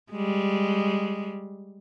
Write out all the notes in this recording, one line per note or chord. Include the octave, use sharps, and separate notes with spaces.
G3 G#3